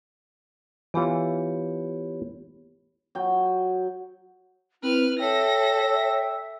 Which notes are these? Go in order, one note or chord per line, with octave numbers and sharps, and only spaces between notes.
E3 B3 F4 G4 C#5
F#3 G5
C4 E4 B4 F6
A4 C#5 E5 G5 A#6